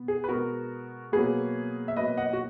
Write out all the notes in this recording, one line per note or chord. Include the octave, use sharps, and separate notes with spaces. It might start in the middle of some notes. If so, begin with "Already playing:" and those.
Already playing: B2 B3
G#4
B4
B2 G#3 B3 F#4 A#4
B2 F#3 A#3 G#4 B4
E5
B2 F#3 A#3 B4 D#5
D#5 F#5
F#4